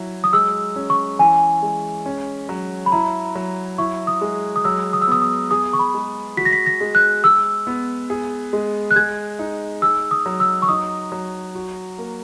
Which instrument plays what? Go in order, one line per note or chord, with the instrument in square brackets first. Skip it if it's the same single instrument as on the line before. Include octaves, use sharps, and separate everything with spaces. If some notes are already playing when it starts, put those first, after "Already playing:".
Already playing: [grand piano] F#3 E4
[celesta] D#6
[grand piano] G#3 [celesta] E6
[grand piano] C#4
[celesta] C#6
[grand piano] E3 [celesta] G#5
[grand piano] G#3
C#4
F#3
[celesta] B5
[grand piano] E4 [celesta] A#5
[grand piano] F#3
[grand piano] E4 [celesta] C#6
[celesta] D#6
[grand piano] G#3
[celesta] D#6
[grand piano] F#3 [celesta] E6
[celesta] D#6
E6
[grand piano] B3 [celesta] D#6
[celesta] D#6
[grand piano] G#4 [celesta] D#6
[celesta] C#6
B5
[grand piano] G#3
[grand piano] F#4 [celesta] B6
[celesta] A#6
B6
A#6
[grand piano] G#3
[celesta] F#6
[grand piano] G#3 [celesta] E6
[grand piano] B3
G#4
G#3
[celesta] F#6
[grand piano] G#3 [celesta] G#6
[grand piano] D#4
[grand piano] G#4 [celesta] E6
[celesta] D#6
[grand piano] F#3
[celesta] E6
C#6
[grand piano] D#4 [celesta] D#6
[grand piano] F#3
F#4
A#3